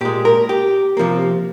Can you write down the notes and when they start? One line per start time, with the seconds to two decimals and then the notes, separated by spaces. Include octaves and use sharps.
0.01 A#2 G#3 G4
0.25 A#4
0.49 G4
0.97 C3 F3 A#3